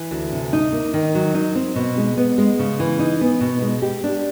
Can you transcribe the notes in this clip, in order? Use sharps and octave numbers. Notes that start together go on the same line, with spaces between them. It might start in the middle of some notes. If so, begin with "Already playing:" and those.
Already playing: E3
D2
C3
D#4
A#3
D#3
F#3
D#4
C4
B2
G#3
B3
G#3
C#3
E3
D#4
B3
B2
G#3
G4
D4